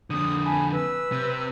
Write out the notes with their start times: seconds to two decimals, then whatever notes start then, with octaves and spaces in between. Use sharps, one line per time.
0.10 F2 D3 D#6
0.44 G#5 A5 B5
0.72 B4 E6
1.12 C3